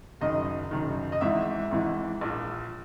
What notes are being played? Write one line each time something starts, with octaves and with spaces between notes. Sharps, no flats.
F#1 F#2 D#3 D#5
F#1 F#2 D#3
D#5
G#1 G#2 E3 E5
G#1 G#2 E3
A#1 A#2